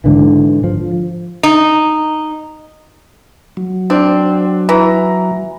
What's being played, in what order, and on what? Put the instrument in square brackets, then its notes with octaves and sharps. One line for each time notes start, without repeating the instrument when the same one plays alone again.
[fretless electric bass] G#2 D3 E3
F3
[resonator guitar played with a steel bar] D#4
[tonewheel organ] F#3
[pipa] C4 [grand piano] D4
[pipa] E3 [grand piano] A#5